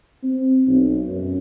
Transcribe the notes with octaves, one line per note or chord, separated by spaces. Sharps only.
C4
B1
F#2